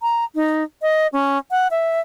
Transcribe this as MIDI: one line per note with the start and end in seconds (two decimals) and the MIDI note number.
0.02 0.24 82
0.35 0.63 63
0.82 1.07 75
1.13 1.38 61
1.51 1.68 78
1.71 2.00 76